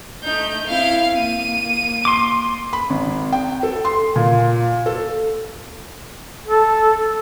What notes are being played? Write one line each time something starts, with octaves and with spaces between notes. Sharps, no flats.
A3 D#4 G6
C4 E4 F5 C7
A#3 D#7
C6 D6
B5
G#1
G5
A4
C6
A#2
A4
A4